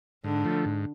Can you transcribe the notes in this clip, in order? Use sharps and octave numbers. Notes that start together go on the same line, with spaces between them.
G#2 D3
F3 A3
G#2